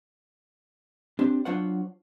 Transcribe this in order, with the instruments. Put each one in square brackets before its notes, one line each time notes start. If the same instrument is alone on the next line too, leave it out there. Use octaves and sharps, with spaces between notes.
[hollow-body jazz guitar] C4 D4 G4
F#3 D4 F4 C5 C#5 F#5